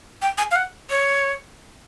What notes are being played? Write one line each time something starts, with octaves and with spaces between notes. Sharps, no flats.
G5
G#5
F5
F#5
C#5